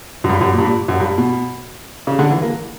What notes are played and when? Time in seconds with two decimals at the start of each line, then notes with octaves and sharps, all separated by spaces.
0.24 F#2
0.29 G2
0.41 F#2
0.53 A#2
0.58 G2
0.65 A#2
0.88 F#2
1.00 G2
1.18 B2
2.07 C#3
2.19 D3
2.30 E3
2.42 A#3